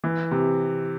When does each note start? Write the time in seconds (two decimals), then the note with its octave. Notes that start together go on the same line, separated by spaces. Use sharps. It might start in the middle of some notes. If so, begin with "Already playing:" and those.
0.04 E3
0.31 C3